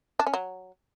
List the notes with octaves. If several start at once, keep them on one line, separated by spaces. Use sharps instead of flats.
D4
C#4
F#3